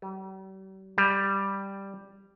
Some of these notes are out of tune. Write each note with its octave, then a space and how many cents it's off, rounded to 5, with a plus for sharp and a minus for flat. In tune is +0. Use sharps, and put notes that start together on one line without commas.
G3 -45
G3 +0